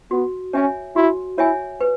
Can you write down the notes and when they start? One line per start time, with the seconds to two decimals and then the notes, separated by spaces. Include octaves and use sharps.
0.11 B3 F#4
0.53 C#4 C#5 E5 G#5
0.96 E4 F#4
1.38 E4 C#5 E5 G#5
1.81 B4